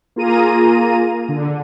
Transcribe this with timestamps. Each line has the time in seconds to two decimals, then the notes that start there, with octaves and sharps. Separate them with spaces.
0.16 A#3 F4 G#4 A#5 D#7
1.29 D3